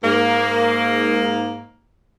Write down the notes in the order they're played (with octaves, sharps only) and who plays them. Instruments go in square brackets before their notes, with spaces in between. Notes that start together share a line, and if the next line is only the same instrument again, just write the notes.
[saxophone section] G#2 A#3